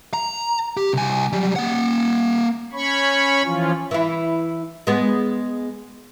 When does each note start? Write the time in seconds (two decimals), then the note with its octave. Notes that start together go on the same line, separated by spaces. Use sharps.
0.14 A#5
0.77 G4
0.93 C2 G#5
1.33 F#3 G3
1.56 A#3 F#5
2.73 C#4 C#5 B5 C#6
3.44 E3 F3 C#4 F4
3.91 E3 E4
4.87 G#3 B3 G#4